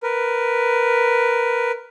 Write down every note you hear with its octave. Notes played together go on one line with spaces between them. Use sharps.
A#4 B4